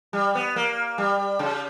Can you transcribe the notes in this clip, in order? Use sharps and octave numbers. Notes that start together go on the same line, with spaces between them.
G3
B3
A#3
G3
C#3